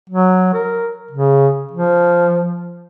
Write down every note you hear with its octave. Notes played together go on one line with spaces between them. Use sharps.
F#3
A#4
C#3
F3